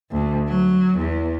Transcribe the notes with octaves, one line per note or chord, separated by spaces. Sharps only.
D2
F#3
E2